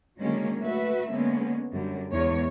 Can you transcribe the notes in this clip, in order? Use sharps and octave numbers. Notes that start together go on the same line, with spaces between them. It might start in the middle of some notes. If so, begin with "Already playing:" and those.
D3 D#3 F#3 G#3 A#3 C#4
A3 F#4 B4 E5
D3 G#3 A#3 B3 C#4
F#2 D3 G3
E2 G#3 C#5